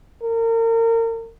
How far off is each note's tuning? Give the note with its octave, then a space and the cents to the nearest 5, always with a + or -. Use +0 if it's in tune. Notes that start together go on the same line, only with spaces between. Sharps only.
A#4 -35